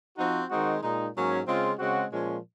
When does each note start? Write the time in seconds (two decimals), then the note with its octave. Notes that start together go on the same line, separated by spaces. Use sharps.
0.17 F3 C4 D#4 F#4
0.50 D#3 G#3 C4 D#4 F#4
0.82 A#2 G#3 D#4
1.15 G#2 F#3 A#3 C#4
1.46 C#3 G#3 C4 F4
1.79 C#3 G#3 C4 F#4
2.11 A#2 F3 G#3 C#4